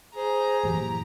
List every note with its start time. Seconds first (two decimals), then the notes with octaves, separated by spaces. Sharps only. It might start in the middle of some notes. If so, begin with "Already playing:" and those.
0.15 G#4 C5 A#5
0.63 F#2 A#2 E3 G4